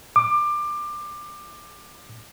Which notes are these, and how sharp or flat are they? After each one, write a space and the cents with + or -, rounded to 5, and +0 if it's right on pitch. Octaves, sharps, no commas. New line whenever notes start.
D6 +20